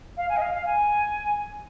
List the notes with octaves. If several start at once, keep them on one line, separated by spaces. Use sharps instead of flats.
F5
G#5
D#5
F5
F5
G#5